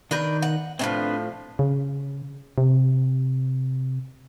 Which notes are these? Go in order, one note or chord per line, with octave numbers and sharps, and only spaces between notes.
D#3 D4 A#4 B4 G6
F#5
A2 E3 F3 C4 D4 B4
C#3
C3